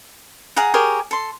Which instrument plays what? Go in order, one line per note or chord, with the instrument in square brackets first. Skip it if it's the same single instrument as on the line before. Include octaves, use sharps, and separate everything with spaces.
[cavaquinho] G#4 F5 F#5 A#5
G4 G#4 A#4 C#5
A4 C6